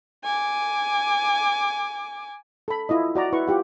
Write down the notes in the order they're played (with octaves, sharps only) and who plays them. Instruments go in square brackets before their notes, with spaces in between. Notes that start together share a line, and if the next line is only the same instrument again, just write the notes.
[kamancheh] G#5 D6
[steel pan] A4 B5
E4 F4 D#5
F#4 D5 A#5
E4 B4 C#6
F4 G4 F#5